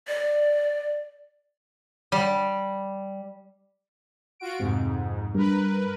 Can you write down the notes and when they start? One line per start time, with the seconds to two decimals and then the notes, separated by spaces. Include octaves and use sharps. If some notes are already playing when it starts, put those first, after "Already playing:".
0.08 D5
2.12 G3
4.40 F4 F#4 D7
4.60 F2 G#2 C3
5.35 G2 A#4 B4